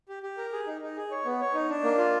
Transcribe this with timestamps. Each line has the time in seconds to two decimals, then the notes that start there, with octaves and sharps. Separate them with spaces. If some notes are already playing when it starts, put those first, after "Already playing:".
0.09 G4
0.23 G4
0.37 A#4
0.53 G#4
0.67 D#4
0.82 D#4
0.96 G#4
1.11 C#5
1.25 B3
1.41 C#5
1.54 D#4
1.69 D4
1.84 A#3
1.98 F4